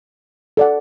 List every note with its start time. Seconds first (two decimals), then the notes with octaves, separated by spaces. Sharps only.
0.57 A4 D5 F#5